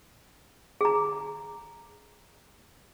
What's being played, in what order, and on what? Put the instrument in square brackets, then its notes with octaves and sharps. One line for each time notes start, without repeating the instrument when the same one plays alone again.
[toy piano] G#4 A#5